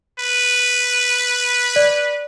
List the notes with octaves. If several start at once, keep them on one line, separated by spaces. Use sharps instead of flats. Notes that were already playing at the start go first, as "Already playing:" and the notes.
B4
D5